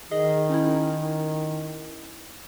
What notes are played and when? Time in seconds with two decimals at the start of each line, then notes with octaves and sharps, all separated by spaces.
0.11 D#3 G#4 D#5
0.50 C#4 D#4 E4